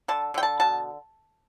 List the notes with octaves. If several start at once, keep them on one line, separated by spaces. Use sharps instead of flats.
D3 A5
D3 G5
A5
B2 A5